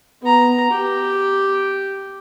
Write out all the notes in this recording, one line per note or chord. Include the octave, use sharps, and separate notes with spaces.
B3 A#5
G4